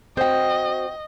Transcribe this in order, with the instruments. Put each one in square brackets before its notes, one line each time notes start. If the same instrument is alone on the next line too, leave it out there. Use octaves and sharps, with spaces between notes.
[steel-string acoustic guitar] C4 F#4 [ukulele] C5 G5 [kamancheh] D#5